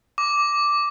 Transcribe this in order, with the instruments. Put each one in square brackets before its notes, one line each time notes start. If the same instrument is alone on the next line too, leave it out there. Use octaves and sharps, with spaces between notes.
[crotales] D6